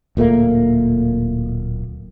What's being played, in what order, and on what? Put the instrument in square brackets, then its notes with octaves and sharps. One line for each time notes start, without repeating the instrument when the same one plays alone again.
[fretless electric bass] D1 A#2 A3 A#3